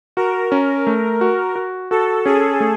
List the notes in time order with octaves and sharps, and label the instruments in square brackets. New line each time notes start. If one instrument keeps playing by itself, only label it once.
[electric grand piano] F#4 [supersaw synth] A#4
[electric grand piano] C#4
A3
F#4
F#4
[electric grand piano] F#4 [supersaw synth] A4
[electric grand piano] C#4 [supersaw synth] G#4
[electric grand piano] A3